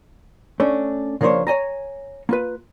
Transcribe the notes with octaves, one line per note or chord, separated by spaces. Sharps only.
A3 C#4 D4
C#3 F3 A#3 D4 C5 C#5
C#5 D#5 G#5 A#5
A#3 F4 B4